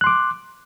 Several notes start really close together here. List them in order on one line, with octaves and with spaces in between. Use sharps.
F#6 C6 D6